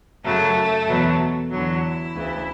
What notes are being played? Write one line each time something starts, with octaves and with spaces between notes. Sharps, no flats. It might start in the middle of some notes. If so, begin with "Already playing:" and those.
F#2 C#3 F#3 A3 A4
E2 B2 F#3
E2 D3 F#3 E4
D2 C#3 E3